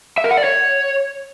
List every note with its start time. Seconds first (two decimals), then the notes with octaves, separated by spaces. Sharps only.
0.18 E5
0.24 A#4
0.31 F#5
0.37 D5
0.44 C#5